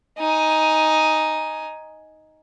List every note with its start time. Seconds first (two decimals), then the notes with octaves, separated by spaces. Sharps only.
0.19 D#4 G#5